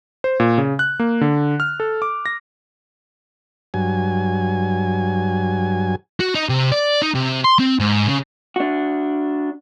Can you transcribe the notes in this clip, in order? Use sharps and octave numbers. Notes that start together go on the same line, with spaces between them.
C5
A#2
C#3
F#6
A#3
D3
F6
A4
D6
A#6
G2 F#3 G#5
F#4
D#4
C3
D5
D#4
C3
C6
C4
G#2
C#3
D4 F#4